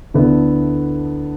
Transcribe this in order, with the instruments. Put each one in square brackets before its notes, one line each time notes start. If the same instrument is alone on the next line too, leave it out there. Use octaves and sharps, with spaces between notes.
[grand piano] D2 D3 B3 E4